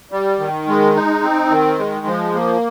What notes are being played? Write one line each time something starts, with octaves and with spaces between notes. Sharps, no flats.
G3
D#3
G#3
D#4
C4
D#3
G#3
F3
A#3